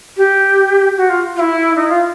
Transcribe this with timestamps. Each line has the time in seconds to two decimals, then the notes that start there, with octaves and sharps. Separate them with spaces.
0.17 G4
0.97 F#4
1.09 F4
1.36 F4
1.39 E4
1.75 D#4
1.88 F4